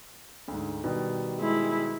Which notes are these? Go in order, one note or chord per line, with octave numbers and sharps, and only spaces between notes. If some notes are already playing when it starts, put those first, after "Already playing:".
D2 G#2
B2 D#3 G3
G#3 E4